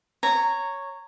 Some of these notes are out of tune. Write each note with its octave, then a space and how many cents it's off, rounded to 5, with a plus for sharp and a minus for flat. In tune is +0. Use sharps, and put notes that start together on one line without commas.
C#5 +0 A#5 -15